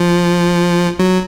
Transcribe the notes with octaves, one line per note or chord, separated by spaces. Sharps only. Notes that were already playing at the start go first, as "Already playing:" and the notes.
Already playing: F3
F#3